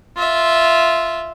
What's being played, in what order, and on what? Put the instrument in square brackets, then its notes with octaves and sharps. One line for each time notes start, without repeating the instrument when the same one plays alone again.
[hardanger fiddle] F4 E5